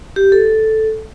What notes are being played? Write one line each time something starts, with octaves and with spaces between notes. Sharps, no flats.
G4
A4